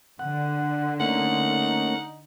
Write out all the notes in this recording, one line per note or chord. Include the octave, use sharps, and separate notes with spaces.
D3 F#5
A3 A#3 C#4 D#4 F#5